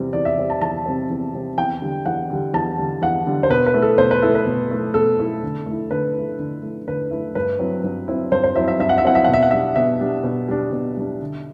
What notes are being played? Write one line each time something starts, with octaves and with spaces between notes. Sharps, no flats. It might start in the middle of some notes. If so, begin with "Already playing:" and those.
Already playing: E2 C3 G3 C4
E2 D5
E5
C3 G3 C4
A5
E2 A5
C3 G3 C4
E2
C3 G3 C4
E2 G5
D3 G3
E2 F#5
D3 G3
E2 A5
D3 G3
E2 F#5
D3 G3
C5
B2 B4
B4
A3 E4
A4
B2 C5
B4
A3 E4 A4
B4
B2
A3 E4
B2 A4
A3 E4
D3
A3 E4
D3 B4
A3 E4
D3
A3 E4
D3 B4
A3 E4
G2 B4
F#3 C4 E4
G2
F#3 C4 E4
G2 C5
C5
F#3 C4 E4 E5
E5
G2 E5
F#5
E5
F#3 C4 E4 F#5
E5
B2 F#5
E5
F#5
G3 D4 E5
B2 E5
G3 D4
B2
G3 D4
B2
G3 D4
D3